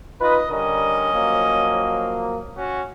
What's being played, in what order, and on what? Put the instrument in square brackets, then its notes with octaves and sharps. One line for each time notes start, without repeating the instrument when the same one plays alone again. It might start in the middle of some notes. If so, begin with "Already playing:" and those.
[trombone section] D#4 F4 B4 [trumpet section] D#5
[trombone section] D3 G3 A#4 [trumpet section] C#4 D#5
[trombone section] F3 F#3 A#3
[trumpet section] C#4 F#4